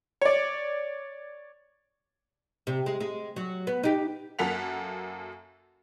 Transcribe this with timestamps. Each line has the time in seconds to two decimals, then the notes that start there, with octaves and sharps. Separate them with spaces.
0.22 C#5 D5
2.67 C3
2.86 G#3
3.00 G#3
3.36 F#3
3.67 B3
3.83 D#4 G4
4.39 F#2 A#3 A4 F#5 B6 F7